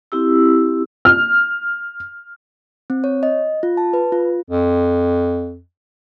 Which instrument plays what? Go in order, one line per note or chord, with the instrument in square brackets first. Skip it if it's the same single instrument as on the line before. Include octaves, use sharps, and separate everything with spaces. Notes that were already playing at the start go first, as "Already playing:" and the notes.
[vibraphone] C4 E4 G4 E6
[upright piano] F6
[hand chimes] C4
C#5
D#5
F4
A5
B4
F4
[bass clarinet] F2